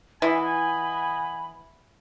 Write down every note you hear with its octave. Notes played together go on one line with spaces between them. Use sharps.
E3 D#5 F#5 G#5 B5